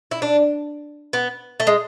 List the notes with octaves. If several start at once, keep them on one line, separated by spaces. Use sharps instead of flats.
E4
D4
B3
A3
G#3